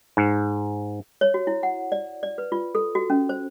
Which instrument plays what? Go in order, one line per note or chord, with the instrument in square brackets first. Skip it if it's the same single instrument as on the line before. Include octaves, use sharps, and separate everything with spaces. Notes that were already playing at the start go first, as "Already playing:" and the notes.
[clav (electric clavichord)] G#2
[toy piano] C#5
F#4
E4
F#5
D5
D5
B4
F4
A4
F#4
C#4
C5